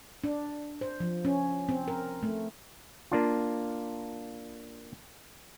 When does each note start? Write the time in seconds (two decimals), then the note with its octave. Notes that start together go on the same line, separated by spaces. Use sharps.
0.24 D4
0.81 C5
1.00 F3
1.25 C#4
1.69 C4
1.88 A#4
2.23 A3
3.11 A#3 D4 F4